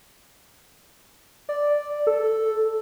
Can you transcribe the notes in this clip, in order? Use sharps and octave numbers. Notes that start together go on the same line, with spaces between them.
D5
A4